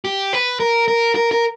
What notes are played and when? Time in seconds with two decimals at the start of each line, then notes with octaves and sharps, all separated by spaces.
0.05 G4
0.33 B4
0.60 A#4
0.88 A#4
1.15 A#4
1.32 A#4